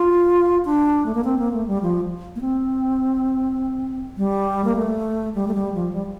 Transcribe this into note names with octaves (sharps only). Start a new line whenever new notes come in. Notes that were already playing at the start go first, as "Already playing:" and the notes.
Already playing: F4
D4
A3
A#3
C4
A#3
A3
G3
F3
A#3
C4
G3
A#3
A3
G3
A3
G3
F3
G3